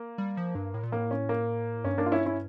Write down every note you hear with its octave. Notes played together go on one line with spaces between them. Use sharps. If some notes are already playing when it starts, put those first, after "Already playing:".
Already playing: A#3
G3
F3
G2
A2
A#2
A2 A#3
C#4
A#3
G2 C#4
A#3 D4
F4
C#4 E4
C#4 E4